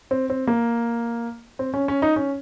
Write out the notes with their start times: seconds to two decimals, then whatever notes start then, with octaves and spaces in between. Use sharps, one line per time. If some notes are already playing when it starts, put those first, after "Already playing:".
0.11 C4
0.30 C4
0.47 A#3
1.59 C4
1.74 C#4
1.88 C#4
2.02 D#4
2.16 C#4